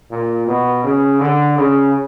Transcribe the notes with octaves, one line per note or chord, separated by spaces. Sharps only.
A#2
B2
C#3
D3
C#3